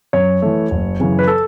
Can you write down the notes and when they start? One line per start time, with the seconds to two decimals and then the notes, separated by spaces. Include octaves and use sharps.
0.13 F#2 C#5
0.42 E3 A3
0.71 F#1
1.00 F#2 C#3 E3
1.19 B4
1.27 A4